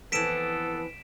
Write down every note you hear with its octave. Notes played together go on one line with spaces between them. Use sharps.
F2 E3 B3 A4 B4 B6 D7 E7